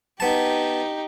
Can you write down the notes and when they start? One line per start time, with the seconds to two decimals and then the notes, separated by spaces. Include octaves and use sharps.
0.20 B3 D#4 G4 A5